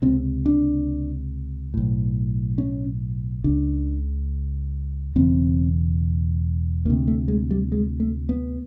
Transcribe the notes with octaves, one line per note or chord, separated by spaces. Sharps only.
C#2 C3 C4
D4
B1 A2
C#4
C#2 C#3 D4
E1 E2 C#3 C4
D2 C3 A#3
A3
G#3
G3
G#3
A3
B3